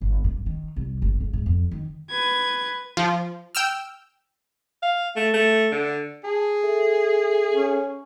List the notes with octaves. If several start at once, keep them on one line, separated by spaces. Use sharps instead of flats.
G1
G2
D#3
C2
G1
C#2
G#2
F2
D#3
B4 G#6
F3
G5 E6 F6
F5
A3
A3
D3
G#4 A5
A4 E5
C#4